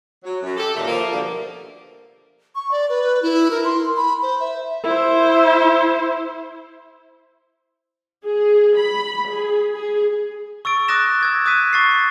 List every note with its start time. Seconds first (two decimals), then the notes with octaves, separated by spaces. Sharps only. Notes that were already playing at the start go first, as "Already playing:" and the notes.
0.24 F#3
0.43 F#2
0.57 G4 A4
0.75 D#2 A#2 D#3 A3
0.87 F3 A#3
1.11 B2 D3 F3 G3 A3
2.55 C#6
2.71 D5
2.89 B4
3.22 E4
3.51 A#4
3.65 C6
3.96 B5
4.22 C5
4.40 E5
4.84 E4 C5
8.24 G#4
8.77 B5
9.31 G#4
9.74 G#4
10.65 C#6 E6 A6 D7
10.88 D6 D#6 F#6 A6 A#6 E7
11.21 E6 G#6 A#6
11.46 D6 D#6 F#6 G#6 B6 D#7
11.73 C#6 A6 C7